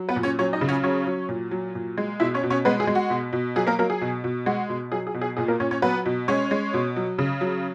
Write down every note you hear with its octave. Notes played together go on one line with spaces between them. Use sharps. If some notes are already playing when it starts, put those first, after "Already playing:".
Already playing: F#3
B3 B4
A#2
C#4 C#5
F#3 C#4 C#5
D#4 D#5
C#3
C#4 C#5
F#3 C#4 C#5
F#3
A#2
F#3
A#2
G#3
B2 E4 E5
C#4 C#5
B2
C#4 C#5
G#3 B3 B4
G#4
G#3
F#4
B2
B2
F#3 G#4
A#3 A#4
F#3 A#3 A#4
G#4
B2
B2
G#3 F#4
B2
F#3 G#4
G#4
B2
G#4
A#2 G#4
A#3 A#4
A#2 C#4 C#5
C#4 C#5
F#3 B3 B4
B2
G#3 C#4 C#5
G#3
B2
F#3
C#3
F#3